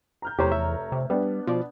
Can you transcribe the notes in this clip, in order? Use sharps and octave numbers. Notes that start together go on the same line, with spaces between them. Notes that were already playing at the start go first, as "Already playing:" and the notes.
A#5 F6 G6
F1 E2 G4 C5 C#5 A#5
E5
C3
G3 B3 D4
B2 F3 D5